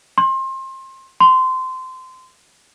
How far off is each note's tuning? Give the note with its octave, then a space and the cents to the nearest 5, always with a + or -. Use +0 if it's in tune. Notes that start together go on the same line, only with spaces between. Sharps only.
C6 +30
C6 -20